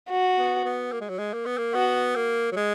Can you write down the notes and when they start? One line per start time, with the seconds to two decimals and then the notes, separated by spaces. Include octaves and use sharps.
0.10 F#4
0.38 B3
0.65 B3
0.92 A#3
1.01 G#3
1.09 F#3
1.18 G#3
1.33 A#3
1.46 B3
1.58 A#3
1.74 B3 F#4
2.16 A#3
2.52 F#3
2.56 G#3